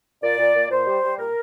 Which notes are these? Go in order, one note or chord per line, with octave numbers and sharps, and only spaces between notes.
A#2 D5
A#2
A#2
A#2 C5
G3
G3
A#2 A#4